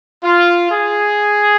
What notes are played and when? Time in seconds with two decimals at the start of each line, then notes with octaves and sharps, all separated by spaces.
0.24 F4
0.72 G#4